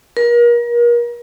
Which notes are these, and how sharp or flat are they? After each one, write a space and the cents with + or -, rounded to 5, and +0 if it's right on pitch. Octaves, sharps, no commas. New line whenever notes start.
A#4 +35